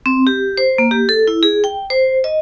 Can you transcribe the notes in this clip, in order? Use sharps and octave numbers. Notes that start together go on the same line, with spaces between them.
C4
G4
C5
A#3
G4
A4
E4
G#4
G5
C5
D#5